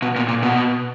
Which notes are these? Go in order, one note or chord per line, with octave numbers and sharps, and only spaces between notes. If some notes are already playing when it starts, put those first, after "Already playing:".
B2
A#2
A#2
B2